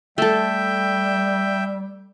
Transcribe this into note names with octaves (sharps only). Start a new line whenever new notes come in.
G3 A3 A4 E5 G5